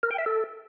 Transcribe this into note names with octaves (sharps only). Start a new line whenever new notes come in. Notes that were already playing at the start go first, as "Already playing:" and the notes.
A#4
G5
E5
A4